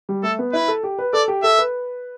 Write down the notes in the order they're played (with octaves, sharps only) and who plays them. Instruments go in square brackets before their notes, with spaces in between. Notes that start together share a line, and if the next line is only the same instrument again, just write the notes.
[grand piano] G3
[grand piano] A3 [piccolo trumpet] A4
[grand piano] B3
[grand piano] E4 [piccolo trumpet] B4
[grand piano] A4
G4
B4
[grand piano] A4 [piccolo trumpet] D5
[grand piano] G4
[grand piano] A4 [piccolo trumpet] E5
[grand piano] B4